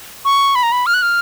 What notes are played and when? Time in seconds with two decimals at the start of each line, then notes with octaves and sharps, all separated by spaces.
0.25 C#6
0.55 B5
0.63 A#5
0.72 B5
0.86 F6
0.94 F#6
1.02 F6